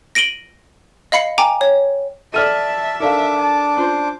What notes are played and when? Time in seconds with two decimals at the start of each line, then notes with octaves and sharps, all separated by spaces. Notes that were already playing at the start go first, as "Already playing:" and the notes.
0.15 A#6 D7 D#7 F#7 G7
1.12 D#5 F5 B5 C7 C#7
1.38 G5 G#5 A#5 D6
1.61 C#5
2.34 A4 D5 E5 A5 F6 D#7
3.00 D4 D#4 A4 A#4 D5 F5 D6
3.39 A5
3.77 C#4 F4 C5